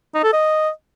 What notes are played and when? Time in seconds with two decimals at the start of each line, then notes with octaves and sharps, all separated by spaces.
0.14 D#4
0.24 A4
0.33 D#5